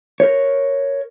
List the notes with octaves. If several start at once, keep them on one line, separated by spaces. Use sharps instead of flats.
A#4 C#5